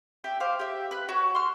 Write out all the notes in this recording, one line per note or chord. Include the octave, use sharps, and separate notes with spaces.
G4 E5 G5
C5 F5 D6
G4 E5
B4 F#6
F#4 C#5
C6 F6